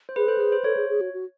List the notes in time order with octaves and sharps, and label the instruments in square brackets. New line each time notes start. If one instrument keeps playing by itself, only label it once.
[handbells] C5
[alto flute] G#4 [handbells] B4
[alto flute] A4 [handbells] C5
[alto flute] G#4 [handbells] B4
[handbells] C5
[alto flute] A4 [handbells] C#5
[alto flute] G#4
G#4
F#4
F#4